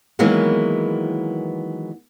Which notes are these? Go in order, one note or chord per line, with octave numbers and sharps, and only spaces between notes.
D#3 E3 F#3 G#3 A#3 B3